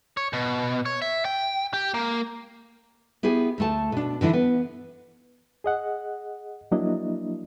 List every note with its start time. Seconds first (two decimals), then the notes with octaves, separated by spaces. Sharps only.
0.17 C#5
0.33 B2
0.86 C#5
1.02 E5
1.25 G5
1.74 G4
1.94 A#3
3.23 B3 E4 G4 G#4
3.58 D2 A3 A5
3.92 B2 D4
4.21 D3 E3 D4 E4
4.33 B3
5.64 G#4 D#5 F#5
6.71 F3 F#3 A#3 D4 E4 D#5